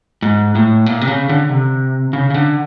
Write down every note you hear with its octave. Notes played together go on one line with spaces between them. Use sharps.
G#2
A2
A#2
C3
C#3
D3
C3
C#3
C#3
D3